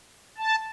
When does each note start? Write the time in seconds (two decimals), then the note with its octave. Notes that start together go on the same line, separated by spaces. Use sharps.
0.38 A5